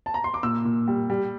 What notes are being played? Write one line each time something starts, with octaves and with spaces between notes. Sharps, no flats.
A5
A#5
C6
D6
A#2 E6
A#2
G3
G3